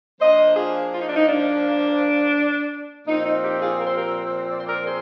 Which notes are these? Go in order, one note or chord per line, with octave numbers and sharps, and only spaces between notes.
F3 A#3 D4 C5 D#5
F4 G#4
F4
D#4
D4
D#4
D4
A#2 F3 C4 D#4
D#4
D#4 G4
F4 G#4
A#4
C5
G4 A#4
D5
C5
A#4 D5
D5
G#4 C5